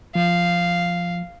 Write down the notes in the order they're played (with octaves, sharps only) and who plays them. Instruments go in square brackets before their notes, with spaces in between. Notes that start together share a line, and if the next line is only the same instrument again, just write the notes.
[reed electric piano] F3 [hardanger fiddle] F5